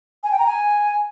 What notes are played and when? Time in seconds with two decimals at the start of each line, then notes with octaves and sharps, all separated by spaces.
0.23 G#5
0.31 G5
0.39 A#5
0.46 G#5